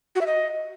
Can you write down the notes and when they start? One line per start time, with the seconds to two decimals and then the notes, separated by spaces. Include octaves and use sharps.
0.15 F#4
0.21 E5
0.27 D#5